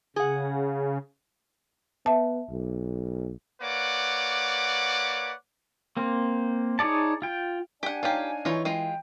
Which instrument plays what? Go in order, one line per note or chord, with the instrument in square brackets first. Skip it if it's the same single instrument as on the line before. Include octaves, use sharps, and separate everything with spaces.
[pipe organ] C#3 [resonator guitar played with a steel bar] G#4 F#5
[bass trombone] B3 [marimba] E5 A5
[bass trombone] B1
[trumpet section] A#3 B4 C#5 D5 F#5 D6
[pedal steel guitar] A#3 C4
D#4 G#4 C#5 D5 A5
F4 G5
[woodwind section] D4 D5 G#5 [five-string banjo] G4 F#5
[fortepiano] D#4 C#5 F5 [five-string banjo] F4 G4
[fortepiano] E3 [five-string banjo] D#4 F4 C#5
[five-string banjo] G#3 F4 [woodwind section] G5